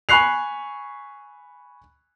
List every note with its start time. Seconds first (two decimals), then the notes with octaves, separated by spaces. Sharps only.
0.09 G#5 B5 C#6 F#6 C7 F7